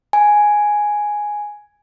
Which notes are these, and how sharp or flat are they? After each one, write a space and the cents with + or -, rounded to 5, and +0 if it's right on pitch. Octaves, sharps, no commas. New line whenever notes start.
G#5 +5